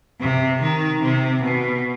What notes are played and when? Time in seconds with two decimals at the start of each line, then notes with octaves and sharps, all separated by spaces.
0.21 C3
0.62 D#3
1.02 C3
1.43 B2